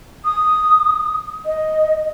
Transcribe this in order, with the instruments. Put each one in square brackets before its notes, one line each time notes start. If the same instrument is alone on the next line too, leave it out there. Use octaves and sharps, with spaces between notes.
[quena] D#6
D#5